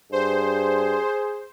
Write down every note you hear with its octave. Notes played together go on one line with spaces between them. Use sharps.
G2 G#4 C5